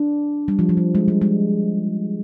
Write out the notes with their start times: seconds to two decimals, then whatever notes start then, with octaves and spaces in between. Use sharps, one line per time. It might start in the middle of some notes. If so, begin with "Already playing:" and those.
Already playing: D4
0.48 G3
0.59 F3
0.69 F3
0.77 G3
0.95 G#3
1.08 G3
1.22 G#3